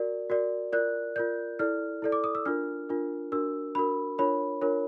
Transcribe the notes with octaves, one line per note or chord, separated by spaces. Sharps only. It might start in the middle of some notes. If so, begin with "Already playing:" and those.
Already playing: F#4 A#4 D5
F#4 A#4 D5
F4 A#4 D5 F#6
F4 A#4 D5 G6
E4 A4 D5 F6
E4 A4 D5
D6
D#6
E6
D4 F4 A#4 F6
D4 F4 A#4
D4 F#4 A#4 E6
D4 F#4 A#4 B5
D4 F4 A#4 C#5 B5
D4 F4 A#4 C#5